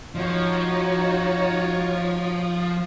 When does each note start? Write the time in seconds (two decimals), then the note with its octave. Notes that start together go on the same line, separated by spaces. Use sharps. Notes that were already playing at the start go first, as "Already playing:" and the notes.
0.15 F3 D#4 F#4 C#5